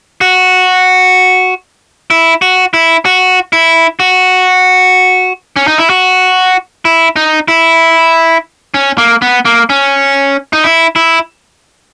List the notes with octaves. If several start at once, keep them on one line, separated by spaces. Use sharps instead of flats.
F#4
E4
F#4
E4
F#4
E4
F#4
C#4
D#4
E4
F#4
E4
D#4
E4
C#4
A#3
B3
A#3
C#4
D#4
E4
E4